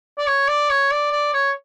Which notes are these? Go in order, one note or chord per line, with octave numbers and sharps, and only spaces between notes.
D5
C#5
D5
C#5
D5
D5
C#5